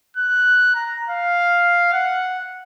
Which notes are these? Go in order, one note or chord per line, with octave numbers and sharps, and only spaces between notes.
F#6
A#5
F5
F#5